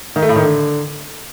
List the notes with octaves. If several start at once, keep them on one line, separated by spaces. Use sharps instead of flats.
D#3
A3
A2
D#3
D3